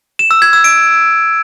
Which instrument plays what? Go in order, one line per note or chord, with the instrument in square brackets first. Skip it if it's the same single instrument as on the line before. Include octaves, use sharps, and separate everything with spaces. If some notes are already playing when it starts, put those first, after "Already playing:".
[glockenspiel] E7
E6
G#6
E6
D7